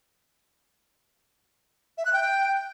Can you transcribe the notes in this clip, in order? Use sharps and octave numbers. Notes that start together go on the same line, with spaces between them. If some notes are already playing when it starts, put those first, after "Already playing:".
E5
F#6
G5